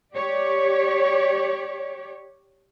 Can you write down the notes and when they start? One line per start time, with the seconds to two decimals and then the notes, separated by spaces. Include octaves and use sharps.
0.14 G4 C#5 D5